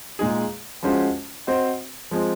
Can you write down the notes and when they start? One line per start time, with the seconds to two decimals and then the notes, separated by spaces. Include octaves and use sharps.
0.19 A#2 G#3 D#4 G#4
0.83 F3 G#3 C#4 F#4 C5
1.47 C4 F#4 C5 D#5
2.11 F3 G#3 C4